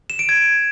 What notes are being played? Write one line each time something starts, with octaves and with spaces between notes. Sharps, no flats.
E7
D7
G#6